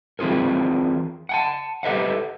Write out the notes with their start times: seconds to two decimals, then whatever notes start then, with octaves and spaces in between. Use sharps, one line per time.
0.19 E3 C4 F4 G#4 A#4
1.29 F#5 G#5 A5
1.83 G4 A4 B4 D#5 E5 F#5